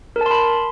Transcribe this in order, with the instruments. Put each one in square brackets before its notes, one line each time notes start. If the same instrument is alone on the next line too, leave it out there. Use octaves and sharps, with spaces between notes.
[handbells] A#4
A5
C6
B5